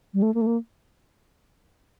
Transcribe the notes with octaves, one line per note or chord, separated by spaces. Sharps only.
G3
A3
A#3
A3
A#3